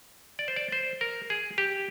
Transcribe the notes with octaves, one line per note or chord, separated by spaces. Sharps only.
D5
C5
D5
C5
A#4
G#4
G4